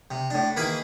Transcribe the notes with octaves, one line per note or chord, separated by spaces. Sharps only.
C3
A2 D4
D#3 E3 A#3 G#4 B5